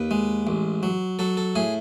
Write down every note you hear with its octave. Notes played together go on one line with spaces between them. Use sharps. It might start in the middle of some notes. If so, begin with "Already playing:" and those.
Already playing: D#2 B4
G#3
A1
F#3
F#3 A4
A4
A2 G#4